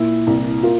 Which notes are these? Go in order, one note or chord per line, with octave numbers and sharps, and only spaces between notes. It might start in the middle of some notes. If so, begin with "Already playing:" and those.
Already playing: A#2 E4
C2
A#3 F4